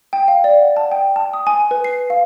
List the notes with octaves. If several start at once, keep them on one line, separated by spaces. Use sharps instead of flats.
G5
F5
D5
F#5
A5
G5
A5
D#6
G#5
B4
C7
F5